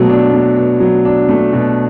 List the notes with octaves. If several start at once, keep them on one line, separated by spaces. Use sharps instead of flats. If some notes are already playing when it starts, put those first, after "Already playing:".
Already playing: B2 F#3 A3
D4
A3
B2
F#3
D4
A3
B2